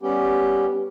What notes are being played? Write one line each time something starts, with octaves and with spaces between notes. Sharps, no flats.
G3 B3 C#4 G4